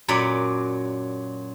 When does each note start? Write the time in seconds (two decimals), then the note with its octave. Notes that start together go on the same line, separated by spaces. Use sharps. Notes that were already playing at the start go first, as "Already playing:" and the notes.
0.08 F#2 A#2 F#3 D5 B5